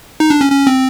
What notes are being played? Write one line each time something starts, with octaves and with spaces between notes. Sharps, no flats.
D#4
D4
C#4
C#4
C4